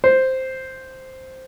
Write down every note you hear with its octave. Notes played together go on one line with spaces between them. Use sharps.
C5